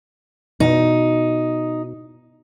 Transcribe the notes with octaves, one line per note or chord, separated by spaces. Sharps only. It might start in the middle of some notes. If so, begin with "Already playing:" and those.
B2 D#4